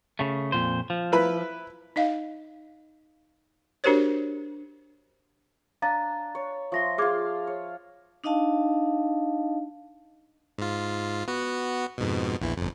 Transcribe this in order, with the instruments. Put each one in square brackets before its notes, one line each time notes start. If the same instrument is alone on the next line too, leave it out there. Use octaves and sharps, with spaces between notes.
[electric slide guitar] C#3 A3
F2 A#2 C5
F3
[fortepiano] E4 B4 B5
[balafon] D#4 D#5 F5
D4 F#4 G4 A#4 C5 C#5
[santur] D4 [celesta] F5 A#5 A6
[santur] C#5
[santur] F3 E5 C6 [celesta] C#6 A#6
[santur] F4 F5 [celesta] G#4 D6 G#6
[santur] C#5
[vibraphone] D4 D#4 D#5 F5 A5
[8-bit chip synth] G#2 F4
B3 F#4
F2 G#2 B2
A#1 E2 E3
G1 F2